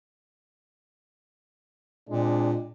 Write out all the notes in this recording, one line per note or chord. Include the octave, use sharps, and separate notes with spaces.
A#2 G#3 C4 D4